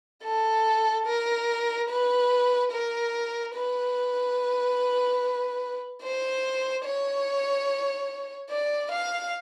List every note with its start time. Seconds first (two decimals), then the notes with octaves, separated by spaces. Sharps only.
0.23 A4
1.06 A#4
1.89 B4
2.71 A#4
3.55 B4
6.02 C5
6.85 C#5
8.50 D5
8.91 F5